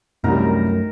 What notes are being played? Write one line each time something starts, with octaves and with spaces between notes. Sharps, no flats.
C2 F#2 D#3 G3 A3 A#4 A#5